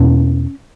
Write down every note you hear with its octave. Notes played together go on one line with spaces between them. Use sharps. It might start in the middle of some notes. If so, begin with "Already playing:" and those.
Already playing: E2 B2 C#4